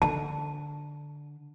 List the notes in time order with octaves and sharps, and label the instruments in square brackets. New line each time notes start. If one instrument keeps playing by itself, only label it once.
[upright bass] D3 [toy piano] A5